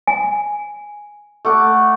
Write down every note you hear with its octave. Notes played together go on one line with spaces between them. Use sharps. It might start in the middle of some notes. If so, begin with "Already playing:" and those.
G#5
A3 F#5 D6